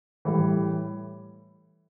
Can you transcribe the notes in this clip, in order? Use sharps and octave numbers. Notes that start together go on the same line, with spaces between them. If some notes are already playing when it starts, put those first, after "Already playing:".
A2 E3 G3